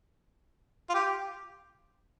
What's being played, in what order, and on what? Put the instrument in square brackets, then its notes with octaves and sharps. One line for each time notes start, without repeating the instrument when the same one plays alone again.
[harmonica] F4
G4